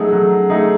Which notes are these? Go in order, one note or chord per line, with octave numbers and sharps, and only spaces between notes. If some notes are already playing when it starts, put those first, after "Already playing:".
Already playing: F#3 A3 D#4 G#4
F#3
A3 D#4 G#4